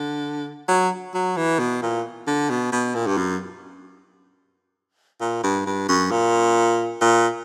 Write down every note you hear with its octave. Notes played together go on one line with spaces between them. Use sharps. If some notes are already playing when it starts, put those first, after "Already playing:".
Already playing: D3
F#3
F#3
E3
B2
A#2
D3
B2
B2
A#2
G2
F#2
A#2
G2
G2
F#2
A#2
A#2